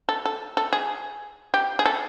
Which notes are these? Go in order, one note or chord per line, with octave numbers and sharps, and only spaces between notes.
A4
A4
A4
G#4
G4
G#4
A4